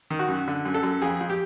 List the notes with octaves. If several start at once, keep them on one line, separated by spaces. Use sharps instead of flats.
D#3
F#4
F#2
D3
F#2
A4
F#2
F2 G#4
F2
G4